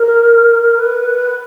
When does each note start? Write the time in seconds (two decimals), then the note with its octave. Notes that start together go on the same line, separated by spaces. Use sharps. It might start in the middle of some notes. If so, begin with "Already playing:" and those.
Already playing: A#4
0.77 B4